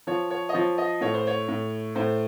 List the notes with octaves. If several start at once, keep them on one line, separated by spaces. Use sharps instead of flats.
F3 C#5
C#5
D#5
F3 C#5
D#5
A2 C#5
C5
C#5
A2
A2 C5